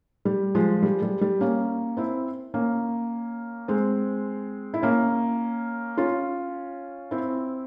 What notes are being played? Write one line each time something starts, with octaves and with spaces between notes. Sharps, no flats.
G3
F3 G#3
G3
G3
G3
A#3 C#4
C4 E4
A#3 C#4
G#3 C4
E4
A#3 C#4
C#4 F4
C4 E4